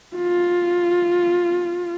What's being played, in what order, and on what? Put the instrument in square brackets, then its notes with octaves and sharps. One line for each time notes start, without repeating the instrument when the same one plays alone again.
[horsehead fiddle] F4